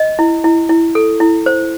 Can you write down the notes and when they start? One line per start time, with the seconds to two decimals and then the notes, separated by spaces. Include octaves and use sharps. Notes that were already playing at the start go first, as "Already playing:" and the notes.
Already playing: D#5
0.19 E4
0.44 E4
0.69 E4
0.95 A4
1.20 E4
1.46 C5